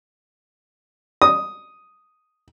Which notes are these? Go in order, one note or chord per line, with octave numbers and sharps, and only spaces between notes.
D#6